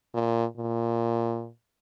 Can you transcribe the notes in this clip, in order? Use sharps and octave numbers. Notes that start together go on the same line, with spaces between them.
A#2
A#2